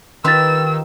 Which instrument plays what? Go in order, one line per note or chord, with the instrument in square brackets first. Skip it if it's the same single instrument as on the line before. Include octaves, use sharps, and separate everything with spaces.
[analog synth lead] D#3 [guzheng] F4 G4 B4 [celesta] C6 A6 [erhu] E6